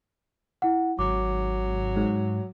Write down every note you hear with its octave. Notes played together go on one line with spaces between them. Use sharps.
E4 F#5
G#1 F#3 D6
G#2